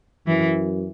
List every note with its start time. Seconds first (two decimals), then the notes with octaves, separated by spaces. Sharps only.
0.27 F#2 E3